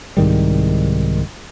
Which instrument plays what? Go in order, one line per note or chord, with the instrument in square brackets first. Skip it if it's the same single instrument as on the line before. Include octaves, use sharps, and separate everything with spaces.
[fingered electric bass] C2 G#2 D#3 G3